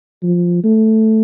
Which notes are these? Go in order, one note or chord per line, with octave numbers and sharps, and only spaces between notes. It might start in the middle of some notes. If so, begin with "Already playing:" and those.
F3
A3